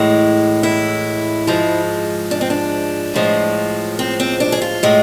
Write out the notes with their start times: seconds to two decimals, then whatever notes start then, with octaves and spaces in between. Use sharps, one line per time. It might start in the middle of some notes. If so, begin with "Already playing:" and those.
Already playing: A2 E3 G#3
0.63 E4
1.47 G#2 F3 G#3
2.31 D4
2.41 C4
2.50 D4
3.14 A2 F3 G#3
3.99 C4
4.20 C4
4.40 D4
4.52 G#4
4.62 F4
4.83 A2 G#3